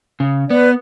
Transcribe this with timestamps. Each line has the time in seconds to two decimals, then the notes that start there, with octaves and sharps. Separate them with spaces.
0.20 C#3
0.50 B3 B4 D5